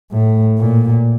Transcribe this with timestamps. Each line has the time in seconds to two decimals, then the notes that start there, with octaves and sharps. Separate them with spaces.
0.11 A2
0.58 A#2